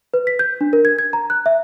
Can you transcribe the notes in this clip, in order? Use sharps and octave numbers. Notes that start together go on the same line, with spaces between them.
B4
B6
G6
D4
A#4
G#6
G#6
A#5
F#6
E5